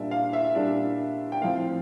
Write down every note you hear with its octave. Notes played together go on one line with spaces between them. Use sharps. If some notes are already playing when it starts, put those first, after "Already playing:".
Already playing: A#2 G3 D4 E5
F5
E5
A#2 G3 D4
G5
A2 F3 C4 F5